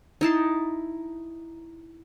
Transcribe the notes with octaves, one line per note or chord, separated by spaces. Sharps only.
D#4 E4 A5 C6